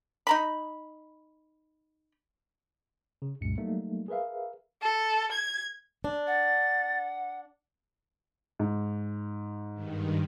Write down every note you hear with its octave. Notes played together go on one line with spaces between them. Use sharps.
D#4 A#5 B5
C#3
C2 F#2 A#2 G#3 C#7
F#3 G3 A3 A#3 D#4
G#4 A#4 B4 E5 F5
A4
G#6
D4
F#5 A6
G#2
G2 D#3